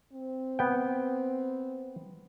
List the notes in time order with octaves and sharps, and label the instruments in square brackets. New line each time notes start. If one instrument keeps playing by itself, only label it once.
[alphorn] C4
[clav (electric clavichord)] B3 G5